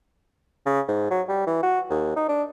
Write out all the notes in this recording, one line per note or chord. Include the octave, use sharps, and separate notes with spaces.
C#3
G#2
F#3
G3
E3
F#4
D#2
D#4
D4